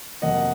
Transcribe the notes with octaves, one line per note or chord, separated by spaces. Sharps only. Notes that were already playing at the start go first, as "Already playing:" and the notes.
F2 C3 F#3 A#3 D#5 F#5